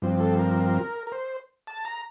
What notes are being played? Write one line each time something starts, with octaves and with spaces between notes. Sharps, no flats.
G2 F3 C4
A4
A#4
A#4
C5
A5
A#5